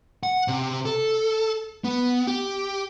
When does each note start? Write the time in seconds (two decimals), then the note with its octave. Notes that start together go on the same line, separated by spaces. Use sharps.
0.23 F#5
0.48 C3
0.85 A4
1.84 B3
2.27 G4